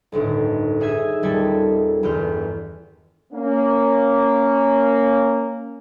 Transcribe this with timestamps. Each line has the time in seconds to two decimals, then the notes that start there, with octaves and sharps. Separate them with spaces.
0.12 G1 D2 A2 D#3
0.80 D#4 G#4 E5 D#6 G#6 E7
1.23 D#1 G3 A4 G#6
2.03 G1 E2 B3 F6 G6
3.33 A#3 C#4